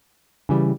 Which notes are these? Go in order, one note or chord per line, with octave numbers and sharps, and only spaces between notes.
C#3 E3 G3